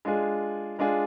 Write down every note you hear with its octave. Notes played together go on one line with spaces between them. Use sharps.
G#3 D4 F4 G#4
G#3 D4 F4 G#4